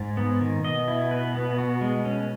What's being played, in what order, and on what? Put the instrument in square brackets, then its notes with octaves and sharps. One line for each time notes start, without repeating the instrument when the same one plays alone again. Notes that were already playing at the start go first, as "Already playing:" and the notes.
Already playing: [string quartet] G#2
[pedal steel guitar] B3
D#3
[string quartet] B2 [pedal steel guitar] D#5
[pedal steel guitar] E4
B4
B3
F#4
G#3
C#4